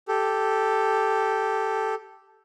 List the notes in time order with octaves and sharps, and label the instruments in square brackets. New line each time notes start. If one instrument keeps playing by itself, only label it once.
[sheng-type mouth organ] G4 A4